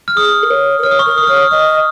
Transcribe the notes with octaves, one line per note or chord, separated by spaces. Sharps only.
F6
G#4 D#6
A#4
C#5
A#4
C#5 F6
D#6
C#6
A#4 D#6
D#6
C#5 F6
D#6
D#5 D#6